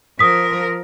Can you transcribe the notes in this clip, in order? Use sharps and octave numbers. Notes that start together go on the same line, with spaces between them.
F3 A#4 D#6 B6